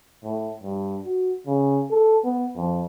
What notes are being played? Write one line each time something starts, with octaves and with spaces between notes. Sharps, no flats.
A2
G2
F#4
C#3
A4
B3
F2